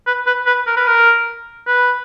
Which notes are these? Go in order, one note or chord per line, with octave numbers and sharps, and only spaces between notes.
B4
B4
B4
A#4
B4
A#4
B4